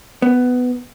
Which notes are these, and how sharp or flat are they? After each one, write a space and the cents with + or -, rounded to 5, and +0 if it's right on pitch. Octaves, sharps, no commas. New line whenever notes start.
B3 +10